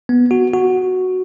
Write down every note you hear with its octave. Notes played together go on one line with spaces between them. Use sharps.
B3
F#4
F#4